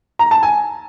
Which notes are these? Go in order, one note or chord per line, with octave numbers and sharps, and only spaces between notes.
A#5
A5
G#5